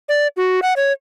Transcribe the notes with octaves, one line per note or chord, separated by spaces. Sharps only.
D5
F#4
F#5
C#5